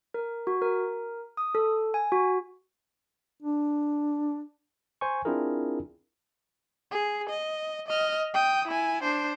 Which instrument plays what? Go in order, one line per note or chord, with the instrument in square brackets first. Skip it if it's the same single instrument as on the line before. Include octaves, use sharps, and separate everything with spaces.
[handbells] A#4
F#4
A#4
D#6
A4
G#5
F#4
[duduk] D4
[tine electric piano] C5 G#5 C#6
C4 D4 E4 F4 G#4 A#4
[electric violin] G#4
D#5
D#5 F6
G5 D#6
E4 G#5
D4 C5